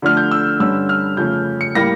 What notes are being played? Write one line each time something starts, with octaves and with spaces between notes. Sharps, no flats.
D3 F3 A3 D4 F6
G6
E6
G2 D3 G3 C#4 E6
F6
F2 C#3 F3 A3 C#4 G6
C#7
A2 G3 A#3 A#6